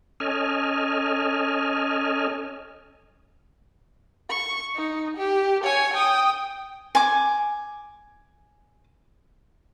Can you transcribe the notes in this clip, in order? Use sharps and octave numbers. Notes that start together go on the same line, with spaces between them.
C#4 A4 D#5 G#5 F6
C#6
D#4
G4
C#5 G#5
G5 D#6
G#5 D6